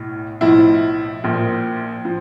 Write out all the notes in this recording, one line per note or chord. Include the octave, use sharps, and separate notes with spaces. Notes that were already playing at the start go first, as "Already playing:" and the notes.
Already playing: B1 A2
B1 A2 F3 E4
A#1 A#2 F3
F3